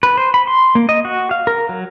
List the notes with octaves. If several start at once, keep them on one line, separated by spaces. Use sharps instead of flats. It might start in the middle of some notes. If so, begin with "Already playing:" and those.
B4
C5
B5
C6
A#3
D#5
F#4
F5
A#4
F#3